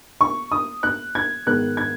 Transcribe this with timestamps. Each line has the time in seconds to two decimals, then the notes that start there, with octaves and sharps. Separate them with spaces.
0.21 C#6
0.52 D#6
0.83 F#6
1.15 G#6
1.46 G#2 D#3 B3 F#6
1.77 G#6